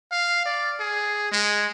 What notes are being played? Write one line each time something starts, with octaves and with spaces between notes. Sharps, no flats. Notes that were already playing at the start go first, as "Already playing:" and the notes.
F5
D5
G#4
G#3